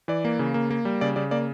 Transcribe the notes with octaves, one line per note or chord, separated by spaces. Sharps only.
E3 D5
A#3
C#3
A#3
A#3
G3
C#3 D5
C#3 D5
A#3 D5